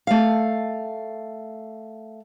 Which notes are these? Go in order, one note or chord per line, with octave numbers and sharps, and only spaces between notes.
A3 F5